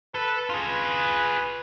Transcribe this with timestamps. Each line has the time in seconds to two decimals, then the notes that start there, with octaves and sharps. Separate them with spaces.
0.15 A4 B4
0.50 F4 G#4 B4